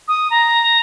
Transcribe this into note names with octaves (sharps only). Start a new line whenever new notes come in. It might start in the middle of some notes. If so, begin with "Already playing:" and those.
D#6
A#5